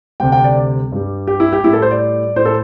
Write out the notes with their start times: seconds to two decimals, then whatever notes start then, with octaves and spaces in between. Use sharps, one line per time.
0.20 D2 C3 G3 G5
0.32 G5
0.44 D5
0.92 G2 G3
1.27 G4
1.40 E4
1.53 G4
1.64 A2 G3 E4
1.73 A4
1.82 C5
1.91 D5
2.36 A2 A3 C5
2.45 A4